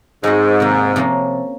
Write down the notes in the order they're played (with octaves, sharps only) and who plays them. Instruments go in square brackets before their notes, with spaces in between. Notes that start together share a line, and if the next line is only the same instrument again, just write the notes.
[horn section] G#2 [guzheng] G#3 C4 F#4
[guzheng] C3 D#3 A#3
C3 F3 A#3 C#4